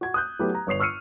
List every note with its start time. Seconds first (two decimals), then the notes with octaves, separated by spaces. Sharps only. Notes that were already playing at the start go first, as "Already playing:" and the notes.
0.01 F#4 G#6
0.14 D#6 F#6 G6
0.39 F#3 A3 B3 E4 G4 B4
0.55 A#5
0.67 G1 C#5 D#6 C7 F7
0.80 C#6 E6 F6 C7 C#7 D#7